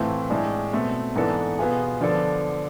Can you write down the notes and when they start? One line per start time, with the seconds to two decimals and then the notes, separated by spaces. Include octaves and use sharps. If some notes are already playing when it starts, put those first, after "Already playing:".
Already playing: A2 E3 A3 C4 F4
0.30 A2 G#3 D4 G#4
0.73 B2 A3 C4
1.15 G#2 E3 B3 D4 A4
1.59 B2 B3 F4 G#4
2.01 D3 F3 B3 D4 A4